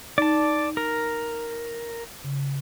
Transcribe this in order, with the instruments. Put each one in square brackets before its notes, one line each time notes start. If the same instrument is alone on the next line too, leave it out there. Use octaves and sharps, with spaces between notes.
[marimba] D#4 [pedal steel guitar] D5 A5
[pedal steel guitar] A#4
[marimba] C#3